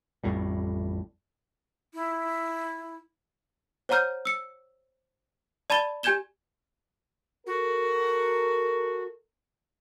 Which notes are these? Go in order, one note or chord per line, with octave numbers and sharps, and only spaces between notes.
A1 F2 A2 G3
E4
C5 C#5 F#5 A#5 F6 G6
E6 C#7
D5 A5 B5 A6 G7
G4 G#5 G6 G#6 E7 G7
F#4 A4 A#4